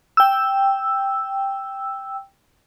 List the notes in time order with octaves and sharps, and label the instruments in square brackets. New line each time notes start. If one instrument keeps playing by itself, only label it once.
[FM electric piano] G5 E6